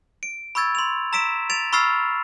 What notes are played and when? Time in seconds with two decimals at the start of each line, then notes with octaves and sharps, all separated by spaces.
0.23 D7
0.55 B5 C#6 E6 G#6 A6
0.75 C6 F7
1.13 A#5 E6 B6 D7 E7
1.50 A6 D7 F7
1.73 B5 C#6 E6 F6 A6 C7